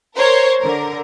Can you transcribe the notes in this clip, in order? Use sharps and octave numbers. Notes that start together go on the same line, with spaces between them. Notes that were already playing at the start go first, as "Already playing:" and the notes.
A#4 C5 C#5
D3 A#4